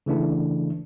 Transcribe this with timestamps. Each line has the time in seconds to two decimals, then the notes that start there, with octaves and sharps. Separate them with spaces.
0.06 C#3 E3 A3 D4 E4